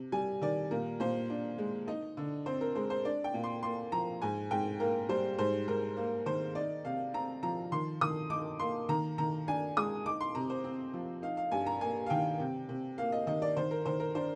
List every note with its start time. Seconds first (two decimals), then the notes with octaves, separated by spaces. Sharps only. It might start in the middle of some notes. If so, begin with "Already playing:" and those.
Already playing: C3
0.12 G3 G#5
0.42 D#3 D5
0.71 A#2 A#4
1.00 A#2 C5
1.30 D4
1.58 G#3
1.87 D#4 D#5
2.17 D3
2.46 C4 C5
2.61 A#4
2.75 G#3 C5
2.90 C5
3.05 D4 D5
3.24 G5
3.34 A#2
3.44 C6
3.63 A#3 C6
3.92 F3 A#5
4.22 G#2 G#5
4.51 G#2 G5
4.80 A#3 A#4
5.09 G3 C5
5.38 G#2 C5
5.68 G#2 A#4
5.97 A#3
6.26 D#3 C5
6.55 D#4 D5
6.84 C3 F5
7.14 C4 A#5
7.43 F3 A#5
7.72 D#3 C6
8.01 D#3 D#6
8.30 D#4 D6
8.60 A#3 C6
8.89 D#3 A#5
9.18 D#3 A#5
9.47 D4 G#5
9.77 G#3 D#6
10.06 D#4 D6
10.21 C6
10.35 C3 A#5
10.50 C5
10.64 C4
10.93 F3
11.22 D#4 F5
11.37 F5
11.52 G2 G#5
11.66 A#5
11.81 A#3 G#5
12.06 F5
12.10 D#3 G5
12.39 C3
12.69 C3
12.98 A#3 F5
13.12 D#5
13.27 D#3 D#5
13.42 D5
13.57 D#3 C5
13.71 A#4
13.86 D#3 C5
14.00 A#4
14.15 D4 C5